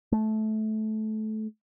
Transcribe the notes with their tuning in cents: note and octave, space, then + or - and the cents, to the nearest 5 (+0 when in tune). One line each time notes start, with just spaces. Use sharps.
A3 -20